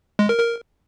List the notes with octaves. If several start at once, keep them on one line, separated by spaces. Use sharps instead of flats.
G#3
A#4
A#4